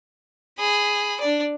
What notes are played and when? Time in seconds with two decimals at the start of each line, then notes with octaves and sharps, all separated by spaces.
0.59 G#4 B5
1.21 D4 D5